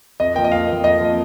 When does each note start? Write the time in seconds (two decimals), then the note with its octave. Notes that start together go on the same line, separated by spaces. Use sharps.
0.20 F2 D#5
0.35 F3 A#3 G5
0.44 D#5
0.52 F2 F5
0.68 F3 A#3
0.84 F2 D#5
1.01 F3 A#3